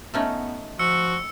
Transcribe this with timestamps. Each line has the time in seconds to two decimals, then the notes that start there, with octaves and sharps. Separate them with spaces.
0.14 A3 B3 C#4 D#4
0.79 F3 F#4 E6 C#7